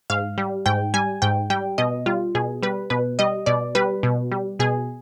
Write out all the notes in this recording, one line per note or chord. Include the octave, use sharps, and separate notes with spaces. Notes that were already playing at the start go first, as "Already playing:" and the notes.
G#2 F5
G3
G#2 G5
G3 G#5
G#2 G5
G3 G5
B2 D#5
G3 F4
B2 G#4
G3 B4
B2 B4
G3 D#5
B2 D5
G3 B4
B2
G3
B2 G#4